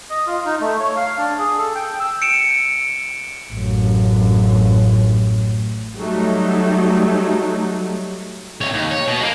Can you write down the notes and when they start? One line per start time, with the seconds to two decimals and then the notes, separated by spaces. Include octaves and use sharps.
0.10 D#5
0.27 F4
0.46 D#4
0.61 A3
0.80 C#5
0.96 F5
1.18 D4
1.39 G#4
1.58 A4
1.75 G5
2.00 E6
2.22 C#7 D7 E7
3.53 A1 F#2
5.97 F#3 G3 A3 D#4
8.61 C2 C#5
8.74 D#2
8.91 C#5
9.08 B2
9.21 G#3 A#3